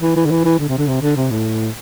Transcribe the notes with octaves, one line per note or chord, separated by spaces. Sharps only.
E3
E3
D3
E3
E3
D3
C3
D3
C3
D3
C3
A2